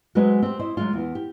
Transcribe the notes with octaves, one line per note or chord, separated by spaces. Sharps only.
F#3 G#3 C4 F#4 B4 D#5
C4 G4
E4 C5 D#5
F#3 G#3 F4
E2 B3
G4